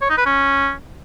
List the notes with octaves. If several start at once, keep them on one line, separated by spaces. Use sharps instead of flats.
C#5
D#4
B4
C#4